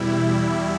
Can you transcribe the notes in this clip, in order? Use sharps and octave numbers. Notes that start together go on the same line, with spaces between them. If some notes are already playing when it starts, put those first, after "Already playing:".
Already playing: E2 B2 G3 E4